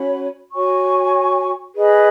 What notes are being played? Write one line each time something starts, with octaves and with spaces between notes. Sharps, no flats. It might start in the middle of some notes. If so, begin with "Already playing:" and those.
Already playing: C#4 F#4 C#5 B5
F#4 C#5 G#5 C#6
G#4 B4 D#5 B5